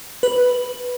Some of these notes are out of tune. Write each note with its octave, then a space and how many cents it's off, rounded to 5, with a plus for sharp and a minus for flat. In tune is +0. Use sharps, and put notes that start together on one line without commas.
B4 +0